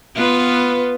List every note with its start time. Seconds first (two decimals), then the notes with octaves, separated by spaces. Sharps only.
0.15 B3 F4 B4